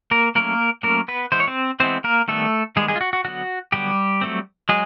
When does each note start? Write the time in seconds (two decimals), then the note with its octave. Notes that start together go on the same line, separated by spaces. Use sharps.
0.11 A#3 A#4
0.35 F#3 A3 A#3 C#4 A#4
0.83 F#3 A3 A#3 C#4 A#4
1.08 B3 B4
1.32 E3 G#3 B3 C5
1.40 C#5
1.47 C4 C5
1.80 E3 G#3 B3 C4 C5
2.04 A#3 A#4
2.28 D#3 G3 A3 B3 A4
2.76 D#3 G3 G#3 B3 G#4
2.88 G#3 G#4
2.96 F4
3.01 F#4
3.13 F#4
3.24 D3 F#3 B3 F#4
3.72 D3 F#3 G3 B3 G4
4.21 F#3 A3 C4
4.69 F#3 G#3 G#4